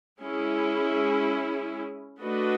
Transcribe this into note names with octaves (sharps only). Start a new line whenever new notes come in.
G#3 C#4 E4 G#4
A3 D4 F#4 B4 D#5